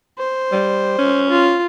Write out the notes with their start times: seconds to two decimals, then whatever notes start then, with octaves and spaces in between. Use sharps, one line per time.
0.18 C5
0.52 G3
0.98 C#4
1.29 F4